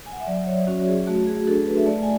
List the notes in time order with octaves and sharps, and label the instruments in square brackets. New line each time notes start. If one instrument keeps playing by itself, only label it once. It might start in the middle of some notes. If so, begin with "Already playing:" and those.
[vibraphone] G#5
F#5
E5
F#3 D5
C#5
C#4 F#4
G#4
A3 F#4
G#4
D4 F#4 A4
B4
E5
A3 D5
G#5